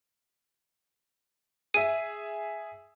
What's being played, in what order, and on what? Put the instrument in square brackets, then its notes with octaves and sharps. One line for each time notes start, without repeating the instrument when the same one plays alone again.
[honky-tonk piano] G#4 E5 [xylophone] D#7